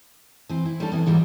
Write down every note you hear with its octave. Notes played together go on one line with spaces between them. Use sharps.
E3 C4
E4
G3 C#4 D4 A4
C3 E3 B3
G#2 E3 F#3 G3